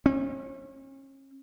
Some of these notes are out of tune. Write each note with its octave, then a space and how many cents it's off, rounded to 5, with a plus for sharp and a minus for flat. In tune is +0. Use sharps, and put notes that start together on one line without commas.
C#4 -40